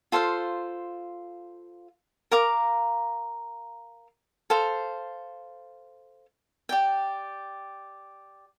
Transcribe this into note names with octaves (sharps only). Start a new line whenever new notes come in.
F4 A4 C5 F5
A#4 F5 A#5 D6
A4 C5 F5
G4 D5 G5